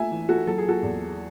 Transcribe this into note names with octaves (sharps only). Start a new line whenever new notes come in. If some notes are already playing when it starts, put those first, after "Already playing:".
Already playing: A3 E5 G#5
E3
F#4 A4
F#3 A4
G#4
F#4 A4
E2